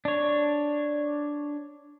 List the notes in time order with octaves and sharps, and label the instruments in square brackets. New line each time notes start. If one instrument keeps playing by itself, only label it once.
[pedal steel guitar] D4 C#5